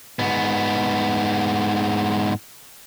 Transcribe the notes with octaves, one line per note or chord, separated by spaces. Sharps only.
G#2 B3